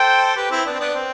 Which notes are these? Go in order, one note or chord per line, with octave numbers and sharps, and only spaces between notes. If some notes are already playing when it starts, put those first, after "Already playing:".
Already playing: A4 C5 G5
G4 B4
C4 E4
B3 D4
C4
B3 D4
C4